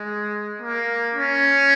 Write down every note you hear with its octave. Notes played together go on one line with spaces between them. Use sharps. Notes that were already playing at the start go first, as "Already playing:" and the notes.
Already playing: G#3
A#3
C#4